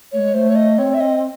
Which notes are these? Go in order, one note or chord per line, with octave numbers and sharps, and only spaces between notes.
A3 C#5
G#3
A3 C5
C#5
D#5
C4 C#5
E5
D#5